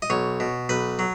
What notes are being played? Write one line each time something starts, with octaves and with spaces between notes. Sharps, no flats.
D#5
B1 C#5
B2
B1 B4
F#3